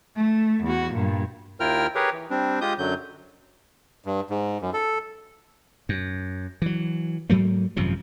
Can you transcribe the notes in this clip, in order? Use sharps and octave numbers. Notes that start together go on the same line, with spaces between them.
A3
E2 F#4
G2 A#2
D#2 E4 F4 A#4 G5 F6
G4 G#4 A#4 B4 C#5
E3
G3 C4 D4
G#3 F4 G4 D#6 G6
F#2 D3 F#3 G6
G2
G#2
F#2
A4
F#2
E3 F#3
G#2 F#3 A3 A#3
G#1 F#2 C3 F3